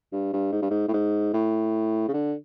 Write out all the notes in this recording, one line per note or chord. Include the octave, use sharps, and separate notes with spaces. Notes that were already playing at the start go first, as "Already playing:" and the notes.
G2
G2
G#2
G2
G#2
A2
G#2
A2
C#3
D3